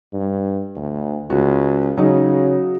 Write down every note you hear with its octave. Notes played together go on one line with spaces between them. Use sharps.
G2
D2
C#2 F#4
C#3 F#3 D#4